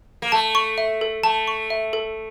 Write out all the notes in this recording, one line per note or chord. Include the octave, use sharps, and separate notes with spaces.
A#3
A3 A5
C#6
E5
A4
A3 A5
C#6
E5
A4